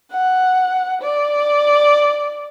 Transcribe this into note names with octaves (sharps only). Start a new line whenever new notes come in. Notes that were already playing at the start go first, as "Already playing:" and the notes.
F#5
D5